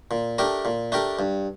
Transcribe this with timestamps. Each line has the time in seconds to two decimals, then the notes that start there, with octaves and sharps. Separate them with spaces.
0.11 A#2
0.38 A3 D4 G4 A#4
0.65 A#2
0.92 A3 D4 G4 A#4
1.19 G2